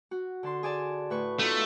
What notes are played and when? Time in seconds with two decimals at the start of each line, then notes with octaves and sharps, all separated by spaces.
0.11 F#4
0.43 D3 A5 C6
0.63 G#4 D5 A5
1.10 A2 B4 C#6
1.39 A3 B3 D#4 F4